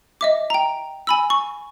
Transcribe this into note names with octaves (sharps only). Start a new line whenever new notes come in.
D#5 E5 D6
G5 A#5
G#5 B5 E6
C#6